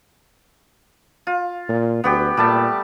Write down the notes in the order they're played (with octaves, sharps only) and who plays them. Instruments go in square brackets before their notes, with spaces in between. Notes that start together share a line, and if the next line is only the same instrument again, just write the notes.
[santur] F4
[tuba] A#2
[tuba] D2 [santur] B3 F#4 G4
[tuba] A#2 [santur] G3 A3 A5